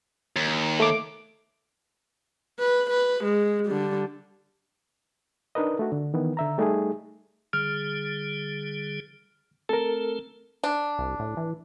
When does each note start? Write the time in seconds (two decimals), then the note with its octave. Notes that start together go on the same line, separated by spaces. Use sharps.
0.36 D#2
0.80 A3 D6
2.59 B4
2.90 B4
3.24 G#3
3.67 D3 G3
5.55 D4 D#4 A#4 B4 D#5
5.79 A3 F#4
5.92 D3
6.14 D#3 E3 B3
6.37 D3 E5 A#5
6.58 G3 A3 D#4 G4 G#4
7.53 D3 G3 G#4 F6
9.69 A3 C4 A4 A#4
10.64 D4
10.99 C2
11.20 A2
11.37 E3